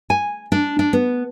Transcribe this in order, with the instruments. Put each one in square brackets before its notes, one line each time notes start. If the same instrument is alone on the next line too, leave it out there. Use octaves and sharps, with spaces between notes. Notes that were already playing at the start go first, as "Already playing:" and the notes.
[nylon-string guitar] G#5
D4
D4
B3